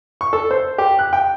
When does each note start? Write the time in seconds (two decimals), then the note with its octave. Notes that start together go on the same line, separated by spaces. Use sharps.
0.21 C#6
0.33 A4
0.51 C5
0.78 G4
0.99 F#6
1.13 G5